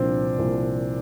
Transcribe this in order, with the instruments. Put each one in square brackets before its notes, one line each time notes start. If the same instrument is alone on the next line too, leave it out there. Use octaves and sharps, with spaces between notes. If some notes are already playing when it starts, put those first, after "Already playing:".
Already playing: [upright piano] C2 A#2 F3 C4 D4
C2 A#2 F3